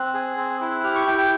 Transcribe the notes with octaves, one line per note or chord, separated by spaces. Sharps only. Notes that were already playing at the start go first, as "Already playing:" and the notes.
Already playing: C4 F#6
G#4
C4
E4
G4 F6
C#6
E4 G5
G5